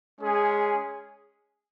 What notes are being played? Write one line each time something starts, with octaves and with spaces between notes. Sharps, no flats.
G#3 C#4 G#4